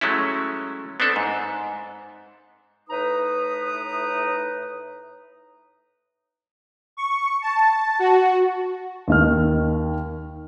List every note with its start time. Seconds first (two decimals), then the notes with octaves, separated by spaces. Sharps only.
0.01 F#3 G#3 A3 C#4 E4
1.00 B3 C4 D4 A4
1.16 G#2
2.89 A2 D#4 B4 A#5 D#6
6.97 C#6
7.42 A5
7.99 F#4
9.08 D#2 D#3 F6